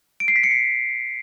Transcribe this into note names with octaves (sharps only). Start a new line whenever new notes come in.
D7
C7
B6
C#7
C7